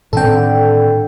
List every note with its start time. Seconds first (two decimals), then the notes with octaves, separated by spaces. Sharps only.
0.13 A2 D3 D#3 C4 A4 G5